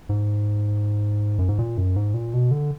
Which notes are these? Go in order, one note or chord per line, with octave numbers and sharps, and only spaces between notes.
G#2
F#2
G#2
A#2
F#2
G#2
A#2
B2
D3